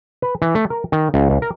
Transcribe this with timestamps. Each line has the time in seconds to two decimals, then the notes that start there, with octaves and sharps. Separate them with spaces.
0.22 B4
0.42 E3
0.55 A3
0.70 A#4
0.92 D#3
1.14 C#2
1.30 C#2
1.42 A#4